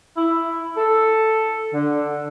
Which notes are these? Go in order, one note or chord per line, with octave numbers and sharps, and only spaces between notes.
E4
A4
D3